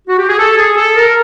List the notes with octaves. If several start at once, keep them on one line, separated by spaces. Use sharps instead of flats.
F#4
G4
G#4
A4
G#4
A4
A#4